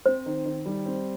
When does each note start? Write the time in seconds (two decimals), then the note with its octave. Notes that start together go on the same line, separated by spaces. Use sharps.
0.06 C4 C5
0.26 D#3
0.45 D#3
0.66 G3
0.86 C4